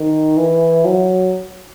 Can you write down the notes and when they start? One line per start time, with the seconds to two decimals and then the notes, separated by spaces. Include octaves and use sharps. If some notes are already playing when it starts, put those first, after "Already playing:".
Already playing: D#3
0.37 E3
0.85 F#3